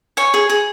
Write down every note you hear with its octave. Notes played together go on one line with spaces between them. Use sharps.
C#5 G#5
G#4
G#4